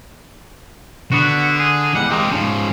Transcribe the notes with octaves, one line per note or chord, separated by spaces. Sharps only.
D3 B3 F#4
G#4
E2 G3 G#3 F#5
G#3 A#3 C4 G4 D#5
G#2 F3 C#4